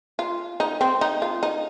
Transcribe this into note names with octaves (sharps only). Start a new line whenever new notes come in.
F4
D#4
C4
D#4
F4
D#4